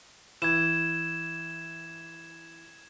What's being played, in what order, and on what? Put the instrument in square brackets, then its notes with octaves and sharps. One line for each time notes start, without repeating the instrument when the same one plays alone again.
[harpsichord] E3 [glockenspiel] G#6 E7